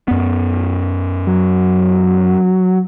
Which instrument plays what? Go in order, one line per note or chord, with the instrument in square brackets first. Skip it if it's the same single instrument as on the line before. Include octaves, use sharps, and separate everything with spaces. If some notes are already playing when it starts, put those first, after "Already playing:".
[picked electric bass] F#2 B3
[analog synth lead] F#3